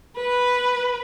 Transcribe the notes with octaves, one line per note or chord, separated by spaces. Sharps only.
B4